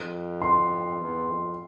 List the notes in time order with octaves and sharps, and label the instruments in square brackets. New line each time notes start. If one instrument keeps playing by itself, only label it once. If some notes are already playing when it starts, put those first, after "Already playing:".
Already playing: [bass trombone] F2
[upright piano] C6
[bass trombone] E2
F2